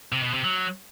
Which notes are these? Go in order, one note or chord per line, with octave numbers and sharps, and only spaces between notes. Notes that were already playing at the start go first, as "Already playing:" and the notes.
C3
B2
C3
F#3